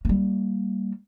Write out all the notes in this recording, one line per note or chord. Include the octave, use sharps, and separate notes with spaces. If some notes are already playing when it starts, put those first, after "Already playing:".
G3 A#3